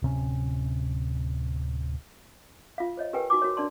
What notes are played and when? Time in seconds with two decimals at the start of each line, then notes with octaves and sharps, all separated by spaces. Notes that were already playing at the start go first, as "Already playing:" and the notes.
0.02 D1 C3 C#4
2.78 F4 F5
2.97 C5 C#5 D#5
3.13 G4 A#4 B4 G5 G#5
3.30 D#4 F#4 G#5 D6
3.42 F#4 A#4 C#5
3.57 D4 A#4 D5 A5 C6